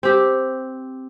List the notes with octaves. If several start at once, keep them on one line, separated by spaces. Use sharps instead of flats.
C4 G4